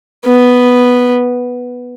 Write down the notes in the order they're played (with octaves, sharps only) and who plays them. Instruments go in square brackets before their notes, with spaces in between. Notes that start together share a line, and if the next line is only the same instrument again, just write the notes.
[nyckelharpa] B3